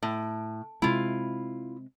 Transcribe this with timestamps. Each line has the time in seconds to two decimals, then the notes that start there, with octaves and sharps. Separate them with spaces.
0.03 A2
0.82 C3 G#3 E4 F4